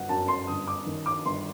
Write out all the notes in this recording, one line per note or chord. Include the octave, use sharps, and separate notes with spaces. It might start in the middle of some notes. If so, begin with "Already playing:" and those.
Already playing: G1 F#3 F#5
F#2 A5
C6
G1 D#6
D6
D#3
D6
G1 C6